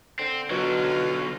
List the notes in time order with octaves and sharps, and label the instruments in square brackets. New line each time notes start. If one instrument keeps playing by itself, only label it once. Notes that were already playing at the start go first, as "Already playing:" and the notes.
[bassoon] D3 [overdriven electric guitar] C4
[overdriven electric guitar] B1 F#3 [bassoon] B2 [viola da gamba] D3 F4